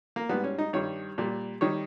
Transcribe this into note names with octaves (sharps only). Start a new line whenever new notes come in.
A#3
G#2 G3 B3
C#4
D#4
G2 D#3 G3 C#5
A#2 G3
D#3 G3 C#5